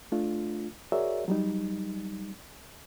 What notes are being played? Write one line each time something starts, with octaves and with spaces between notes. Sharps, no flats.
A3 D4 F4
F#4 G#4 A#4 C#5 D5 E5
F#3 G3 D#4